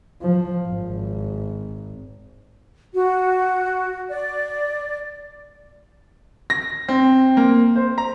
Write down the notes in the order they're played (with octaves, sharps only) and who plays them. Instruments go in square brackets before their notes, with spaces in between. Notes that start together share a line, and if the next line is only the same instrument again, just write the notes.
[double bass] F3
G#1
[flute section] F#4
D5
[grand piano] A#6
C4
A#3
C5
A#5